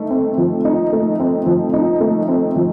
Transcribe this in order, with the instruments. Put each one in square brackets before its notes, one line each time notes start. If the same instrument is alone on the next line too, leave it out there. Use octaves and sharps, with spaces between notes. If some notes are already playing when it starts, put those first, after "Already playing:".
Already playing: [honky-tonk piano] A3 D#4
C4
F3
D#4
A3
C4
F3
D#4
A3
C4
F3